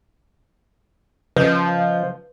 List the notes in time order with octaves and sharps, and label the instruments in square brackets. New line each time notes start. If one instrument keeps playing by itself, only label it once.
[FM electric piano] C#3 D#5 G6 [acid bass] F3 [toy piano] B4